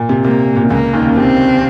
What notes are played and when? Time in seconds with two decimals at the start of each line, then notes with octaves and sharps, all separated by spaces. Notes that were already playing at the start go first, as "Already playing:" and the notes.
Already playing: A#2
0.09 C3
0.25 C3 A#3
0.56 A#2
0.64 C3
0.70 C#2 C#3 A#3
0.93 D#2 D#3
1.07 C#3
1.16 C3 C4